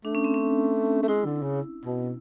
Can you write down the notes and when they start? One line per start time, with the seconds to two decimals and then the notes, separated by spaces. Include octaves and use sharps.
0.05 A3 D4
0.15 C#4
0.24 C4
0.34 C#4
1.03 A3
1.08 G#3 E4
1.26 D3
1.43 C#3
1.86 B2